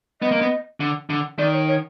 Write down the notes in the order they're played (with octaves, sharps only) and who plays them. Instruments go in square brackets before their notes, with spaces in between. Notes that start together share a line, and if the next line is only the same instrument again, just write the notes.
[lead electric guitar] B3 [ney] D#5
[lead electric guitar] A#3
B3
D3
D3
[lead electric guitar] D#3 [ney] D5
[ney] C#5
C#5